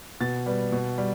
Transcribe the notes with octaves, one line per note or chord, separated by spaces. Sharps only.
B2 A6
G3 B3
B2
G3